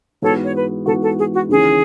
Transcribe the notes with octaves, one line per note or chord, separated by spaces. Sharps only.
G#2 E3 B3 F#4 A4 C#5
C#5
B4
G#2 E3 B3 F#4 A4
A4
G#4
F#4
D#2 C#3 E3 G#4